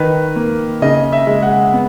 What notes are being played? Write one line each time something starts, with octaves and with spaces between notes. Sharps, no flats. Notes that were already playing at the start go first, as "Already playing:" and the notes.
Already playing: D#3 B4
A#3
C#3 D#5
E5
G#3
F#5
B3